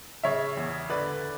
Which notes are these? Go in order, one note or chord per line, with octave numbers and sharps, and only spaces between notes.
C#3 C#5 E5
E2
D3 B4 D5